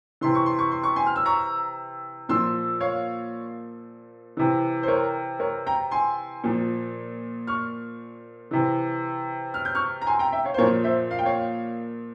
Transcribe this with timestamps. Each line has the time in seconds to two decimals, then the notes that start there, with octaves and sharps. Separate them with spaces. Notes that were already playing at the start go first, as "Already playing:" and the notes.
0.21 C3 E3 C6
0.35 C#6
0.46 C6
0.59 C#6
0.71 C6
0.83 C#6
0.96 G#5 C6
1.07 F6
1.16 E6
1.25 A#5 C#6
2.29 A#2 F3 C6 E6
2.80 C#5 F5
4.37 C3 E3
4.83 C5
4.88 A#4 C#5
5.40 A#4 C#5
5.67 G5 A#5
5.91 G#5 C6
6.44 A#2 F3
7.47 C#6 F6
8.51 C3 E3
9.54 F6
9.65 G6
9.75 C#6 F6
10.02 A#5
10.07 G#5 C6
10.19 G5 A#5
10.32 E5 G5
10.45 C#5 F5
10.54 C5
10.58 A#2 A#4 C#5
10.62 F3
10.84 C5 E5
11.11 F5
11.19 G5
11.25 C#5 F5